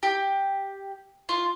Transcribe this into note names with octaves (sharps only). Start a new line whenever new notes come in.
G4
F4